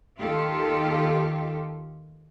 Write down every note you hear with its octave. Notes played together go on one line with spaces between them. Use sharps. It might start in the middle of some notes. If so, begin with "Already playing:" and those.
D#2 D#3 F4 G4 A4